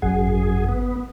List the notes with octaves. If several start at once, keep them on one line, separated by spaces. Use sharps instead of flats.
G#1 F#2 G#4 F#5
B3